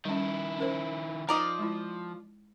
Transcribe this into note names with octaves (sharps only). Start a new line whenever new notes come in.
D#3 G3 C#4 E4
C#4 A#4 C5
F3 D#4 A#4 D5 D#5
G#3 E4